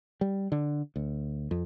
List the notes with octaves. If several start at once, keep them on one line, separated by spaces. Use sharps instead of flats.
G3
D3
D2
F2